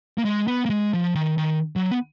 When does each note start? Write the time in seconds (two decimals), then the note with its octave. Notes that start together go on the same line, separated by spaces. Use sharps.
0.18 A#3
0.25 G#3
0.47 B3
0.66 A#3
0.70 G#3
0.93 F3
1.15 D#3
1.38 D#3
1.76 F#3
1.91 B3